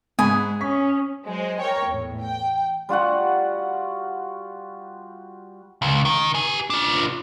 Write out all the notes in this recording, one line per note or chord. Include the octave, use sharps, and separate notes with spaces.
G#2 G#5 B5 D#6
C#4 C#6 B6
F#3 G#3 C5
A#4 C#5 G5
E2 A2
G5
G3 F4 F#4 F#5
C#2
D#3
G4 G#5
D4 F4